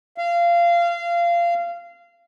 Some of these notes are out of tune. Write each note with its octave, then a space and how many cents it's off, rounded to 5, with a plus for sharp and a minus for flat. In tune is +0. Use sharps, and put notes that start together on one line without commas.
F5 -20